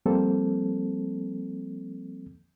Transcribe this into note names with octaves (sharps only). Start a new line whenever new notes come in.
F3 G3 A#3 C4 A4